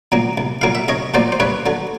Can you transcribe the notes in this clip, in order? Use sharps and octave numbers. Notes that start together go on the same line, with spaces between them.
A#2 F#3 A#3
C2
A#2 F#3 A#3 F5
E5
C2 C#5 D#5
A#2 F#3 A#3 C5 D5
C5
G2 B4 C#5
D3 F#3